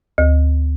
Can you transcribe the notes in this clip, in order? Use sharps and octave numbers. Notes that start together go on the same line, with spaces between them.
D2